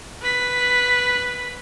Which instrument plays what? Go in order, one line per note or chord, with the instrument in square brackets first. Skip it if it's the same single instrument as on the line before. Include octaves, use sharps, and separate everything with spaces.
[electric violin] B4 B6